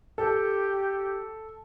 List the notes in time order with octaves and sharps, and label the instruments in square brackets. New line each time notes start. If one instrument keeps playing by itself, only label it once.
[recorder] G4 [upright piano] A4